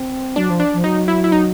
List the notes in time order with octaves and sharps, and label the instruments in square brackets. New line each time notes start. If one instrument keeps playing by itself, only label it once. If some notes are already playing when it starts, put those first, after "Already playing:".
Already playing: [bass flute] C4
[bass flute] F#3 [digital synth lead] D4
[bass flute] F3
[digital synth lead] D4
[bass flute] F3
[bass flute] F#3 [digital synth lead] D#4
[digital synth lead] E4
E4
D#4